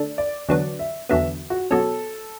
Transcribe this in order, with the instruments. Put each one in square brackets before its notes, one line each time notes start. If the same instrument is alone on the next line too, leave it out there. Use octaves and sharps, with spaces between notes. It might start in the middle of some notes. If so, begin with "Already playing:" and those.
Already playing: [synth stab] D3 A3 D4
[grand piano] D5
[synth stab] E2 D3 F#3 B3 [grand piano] D5
[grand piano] E5
[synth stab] E2 D3 F#3 B3 [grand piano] E5
[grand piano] F#4
[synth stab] B2 F#3 C#4 [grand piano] A4